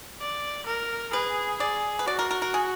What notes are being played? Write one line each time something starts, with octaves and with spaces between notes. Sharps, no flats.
D5
A#4
G#4 B4
G#4 D5
B4
F#4 D5
A#4
A#4
A#4
G#4